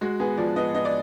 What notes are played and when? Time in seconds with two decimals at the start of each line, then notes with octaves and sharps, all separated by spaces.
0.01 G#3 F#4
0.20 B3 G#4
0.37 F3 D5
0.56 B3 D#5
0.75 B3 D#5
0.85 D5